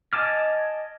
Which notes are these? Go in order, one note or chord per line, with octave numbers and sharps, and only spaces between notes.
D#5 G#5 A5 D6 F6